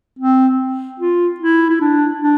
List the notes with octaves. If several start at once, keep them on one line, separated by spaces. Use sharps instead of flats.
C4
F4
E4
E4
D4
D4